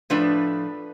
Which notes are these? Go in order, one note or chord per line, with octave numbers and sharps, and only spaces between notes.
A2 F3 A3 D4 B4